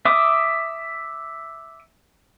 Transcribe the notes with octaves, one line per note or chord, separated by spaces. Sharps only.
E5 D6 D#6